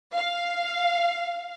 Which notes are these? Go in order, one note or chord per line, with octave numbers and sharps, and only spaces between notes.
F5